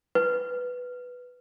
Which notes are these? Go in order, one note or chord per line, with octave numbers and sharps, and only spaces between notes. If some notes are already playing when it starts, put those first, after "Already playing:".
B4